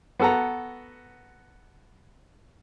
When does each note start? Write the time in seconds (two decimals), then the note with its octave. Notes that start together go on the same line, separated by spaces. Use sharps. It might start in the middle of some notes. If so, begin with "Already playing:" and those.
0.20 B3 F#4 A4 F#5 A#5